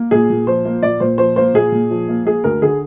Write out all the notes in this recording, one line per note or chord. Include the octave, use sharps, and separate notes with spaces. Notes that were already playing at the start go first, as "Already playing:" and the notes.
Already playing: A#3
A#2 G#4
A#2
F3 C5
A#3
A#2 D5
A#2 C5
F3 C5
A#3 C5
A#2 G#4
A#2
F3
A#3
A#3 G#4
D2 A#4
D3 G#4